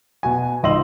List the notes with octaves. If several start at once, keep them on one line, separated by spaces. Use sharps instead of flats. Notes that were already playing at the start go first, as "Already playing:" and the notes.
B2 F#4 G#5
C#2 G#2 D#5 C6 E6 F#7